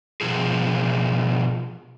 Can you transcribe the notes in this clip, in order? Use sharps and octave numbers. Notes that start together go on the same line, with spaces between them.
B2 F3 G#4